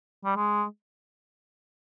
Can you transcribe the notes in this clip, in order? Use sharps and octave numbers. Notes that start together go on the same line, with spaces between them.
G3
G#3